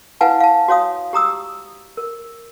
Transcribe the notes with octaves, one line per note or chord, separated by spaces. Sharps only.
E4 B4 F5 F#5 G#5 A5
F5 A5
F#4 C#5 F5 D#6
G4 A#5 D#6 E6
A#4